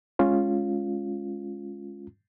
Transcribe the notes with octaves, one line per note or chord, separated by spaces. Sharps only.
G#3 C#4 F4